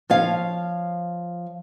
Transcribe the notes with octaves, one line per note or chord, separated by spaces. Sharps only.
F3 C#5 F5